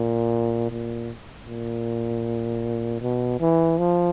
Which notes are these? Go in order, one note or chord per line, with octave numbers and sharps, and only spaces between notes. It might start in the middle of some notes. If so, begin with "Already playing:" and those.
Already playing: A#2
A#2
A#2
B2
E3
F3